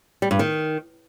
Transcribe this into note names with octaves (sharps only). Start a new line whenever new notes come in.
G3
G2
D#3